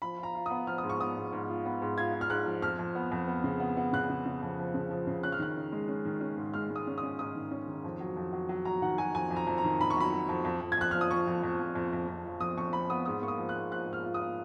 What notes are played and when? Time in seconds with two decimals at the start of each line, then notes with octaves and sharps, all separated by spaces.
0.02 F3 B5
0.18 F4 A#5
0.35 F4
0.46 B3 D#6
0.67 F3 F6
0.78 G#2 D#6
0.90 C#6
1.00 B3 D#6
1.16 G#2
1.33 G#2
1.49 F4
1.65 B3
1.82 G#2
1.98 F4 G#6
2.13 F4
2.21 F6
2.30 G#2 F#6
2.46 F3
2.62 F2 F6
2.79 F2
2.95 B3
3.12 F2
3.28 B3
3.44 C#3
3.60 B3
3.77 B3
3.93 C#3 F#6
4.10 C#3
4.25 C#3
4.42 F2
4.59 F3
4.74 C#3
4.90 F3
5.07 C#3
5.23 C#4 F#6
5.32 F6
5.39 D#3 F#6
5.56 C#4
5.72 G#3
5.88 C#4
6.05 D#3
6.21 C#4
6.37 G#2
6.54 G#3 F6
6.70 G#3
6.76 D#6
6.87 C#4
6.98 D#6
7.03 C#4
7.19 G#2 D#6
7.36 D#3
7.51 C#4
7.68 D#3
7.84 F2
8.00 F#3
8.17 F2
8.33 F#3
8.49 F#3
8.65 F#3 A#5
8.82 D#3 F#5
8.98 F#3 G#5
9.14 F2 G#5
9.31 F2
9.36 A#5
9.47 F2
9.58 A#5
9.64 D#3
9.80 D#3 B5
9.90 C#6
9.97 F#3 B5
10.12 F#3
10.29 F2
10.45 F2
10.61 F2
10.72 G#6
10.77 F2 F#6
10.91 F3 F6
11.01 D#6
11.11 F3 C#6
11.27 F2
11.43 F2
11.60 F2
11.75 F2
11.93 F2
12.08 F2
12.25 F3
12.40 F2 D#6
12.57 F2 C#6
12.73 F3 B5
12.90 B3 D#6
13.06 G#2 D#6
13.22 A#3 C#6
13.28 D#6
13.38 F3
13.49 F#6
13.55 G#2
13.72 F3 F#6
13.87 G#2
13.93 F6
14.04 F4
14.14 D#6
14.20 F4